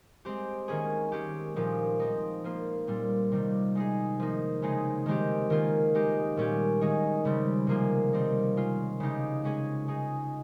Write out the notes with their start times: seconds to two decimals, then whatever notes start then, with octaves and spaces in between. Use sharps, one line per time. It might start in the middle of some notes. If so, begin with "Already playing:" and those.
0.25 G#3 C4 G4
0.68 D#3 A#3 C#4 G#4
1.12 G#3 C#4 G4
1.56 A#2 F3 G#3 D#4 G4
2.00 F3 C4 D#4
2.44 F3 A#3 F4
2.87 A#2 G3 C4
3.32 C3 D#3 G3
3.75 G#3 D#4 G#4
4.19 F3 A#3 D#4
4.62 C#3 G#3 C4 D#4 G#4
5.06 D#3 G#3 C4 G4
5.50 D#3 A#3 F4 G#4
5.95 G#3 D#4 G4
6.36 A#2 G3 C#4 G4
6.81 D#3 G#3 D#4 G#4
7.25 C#3 G3 C4
7.67 C3 F3 A#3 F4 G#4
8.13 D#3 G3 C4 D#4
8.56 G#3 C#4 F4
9.00 C#3 G#3 D#4 G4
9.44 G#3 C#4 G#4
9.88 G#3 D#4 G#4